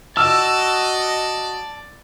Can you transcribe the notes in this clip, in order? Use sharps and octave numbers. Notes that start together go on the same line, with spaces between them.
F#4 D5 D#5 A5 E6